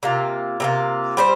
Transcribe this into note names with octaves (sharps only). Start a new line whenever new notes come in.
C3 A#3 F4
C3 A#3 F4
G3 C4 G4 C5